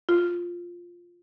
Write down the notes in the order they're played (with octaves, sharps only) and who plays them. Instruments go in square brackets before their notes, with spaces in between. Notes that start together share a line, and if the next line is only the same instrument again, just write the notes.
[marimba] F4